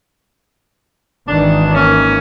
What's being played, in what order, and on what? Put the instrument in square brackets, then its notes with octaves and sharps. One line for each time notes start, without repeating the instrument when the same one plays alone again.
[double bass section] G#1 D#3 E3 [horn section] D4
[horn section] A#3 C#4